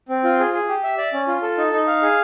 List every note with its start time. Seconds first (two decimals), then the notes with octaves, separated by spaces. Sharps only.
0.09 C4
0.24 F4
0.39 G#4
0.53 G#4
0.68 G4
0.84 E5
0.98 D5
1.13 C#4
1.27 F4
1.42 A4
1.57 D#4
1.72 D#4
1.87 F5
2.02 G#4